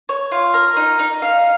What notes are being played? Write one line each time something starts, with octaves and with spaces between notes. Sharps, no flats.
C#5
F4
A#4
D#4
D#4
F5